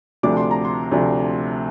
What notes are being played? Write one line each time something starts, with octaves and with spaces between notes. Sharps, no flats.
D2 C3 F3 A3 D4 D6
C6
A#5
C6
D2 C3 F3 A3 D4